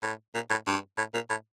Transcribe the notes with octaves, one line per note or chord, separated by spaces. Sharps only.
A2
A#2
A2
G2
A2
A#2
A2